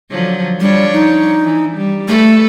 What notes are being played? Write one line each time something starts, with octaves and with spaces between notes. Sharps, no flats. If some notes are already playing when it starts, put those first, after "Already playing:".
D3 F3 F#3
F3 G3 D4 C#5
D#4
E3
G3
A3 A4 B4